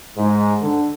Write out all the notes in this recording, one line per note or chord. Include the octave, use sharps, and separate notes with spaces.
G#2
D3